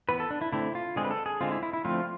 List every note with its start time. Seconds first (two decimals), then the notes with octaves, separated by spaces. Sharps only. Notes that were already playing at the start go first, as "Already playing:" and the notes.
0.09 E3 B3 B4
0.20 A4
0.31 D4
0.41 E4
0.52 D3 A3 C4 E4
0.75 F4
0.96 D3 G#3 C4 G#4
1.05 B4
1.11 A4
1.26 G#4
1.41 D3 G#3 C4 F4
1.52 E4
1.63 E4
1.73 E4
1.85 D3 F3 A3 C4 F4